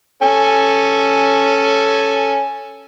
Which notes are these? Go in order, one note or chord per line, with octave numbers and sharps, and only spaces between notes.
C#4 A4 G#5